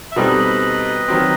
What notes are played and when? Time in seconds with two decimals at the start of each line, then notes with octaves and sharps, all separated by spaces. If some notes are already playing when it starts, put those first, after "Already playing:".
0.12 E5
0.16 B2 G3 C4 D#4 A4 B4 D#5
1.08 D#3 F#3 C4